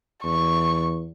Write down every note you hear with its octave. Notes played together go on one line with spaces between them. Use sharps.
E2 C#6